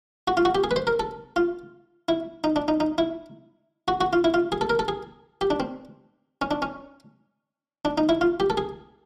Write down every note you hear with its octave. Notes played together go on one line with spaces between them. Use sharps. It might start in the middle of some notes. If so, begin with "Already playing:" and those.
F#4
F4
F#4
G4
G#4
B4
C5
A#4
A4
F4
E4
D#4
D4
D#4
D#4
E4
F#4
F#4
F4
E4
F4
G#4
A4
A#4
A4
G#4
G4
D4
C4
C#4
D4
C#4
D4
D#4
E4
F4
G4
A4
G#4